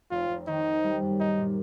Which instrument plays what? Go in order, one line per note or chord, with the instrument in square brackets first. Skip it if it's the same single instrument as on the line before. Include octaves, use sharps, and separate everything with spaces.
[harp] F1 [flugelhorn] F4
[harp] F1
[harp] D#3 [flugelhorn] D#4
[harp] C4
G3
F#2
[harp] A#2 [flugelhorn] D#4
[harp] A#2